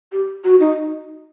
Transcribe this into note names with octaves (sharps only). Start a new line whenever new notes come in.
G4
F#4
D#4